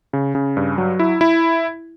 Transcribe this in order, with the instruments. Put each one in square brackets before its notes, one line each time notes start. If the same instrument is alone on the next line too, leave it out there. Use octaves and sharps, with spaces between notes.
[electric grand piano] C#3
C#3
G2
F#3
E4
E4